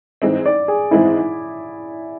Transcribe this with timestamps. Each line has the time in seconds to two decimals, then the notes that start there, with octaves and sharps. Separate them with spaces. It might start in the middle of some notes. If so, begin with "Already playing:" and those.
0.22 G#2 E3 G#3 C4
0.46 D5
0.68 G#4
0.91 G#2 E3 G#3 C4 E4